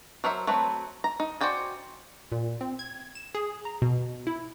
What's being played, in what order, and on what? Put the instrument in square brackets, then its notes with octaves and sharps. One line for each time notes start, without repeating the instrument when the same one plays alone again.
[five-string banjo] F#3 A#4 C5 E5
F#3 A3 C4 B4
A#5
D#4
F#4 C5 D5 G5 G#5
[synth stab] A#2
C4
G#6
E7
G#4
A#5
B2
E4